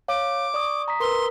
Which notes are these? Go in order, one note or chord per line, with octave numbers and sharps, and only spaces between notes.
C#5 F5 D6
D5 C#6 D#6
A#5 D#6 B6
A#4 B4 C6 E6